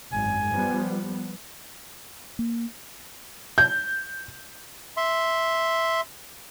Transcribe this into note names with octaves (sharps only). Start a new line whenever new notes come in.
G#1 F#2 G#5
F3 G3 B3
A#3
G6
E5 C6